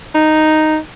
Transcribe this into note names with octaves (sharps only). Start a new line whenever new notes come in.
D#4